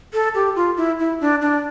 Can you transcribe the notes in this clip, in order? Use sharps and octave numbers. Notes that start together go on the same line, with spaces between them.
A4
G4
F4
E4
E4
D4
D4